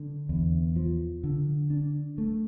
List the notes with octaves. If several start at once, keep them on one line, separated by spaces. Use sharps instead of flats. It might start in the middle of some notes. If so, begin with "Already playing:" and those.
Already playing: D3
E2
F3
D3
D4
A3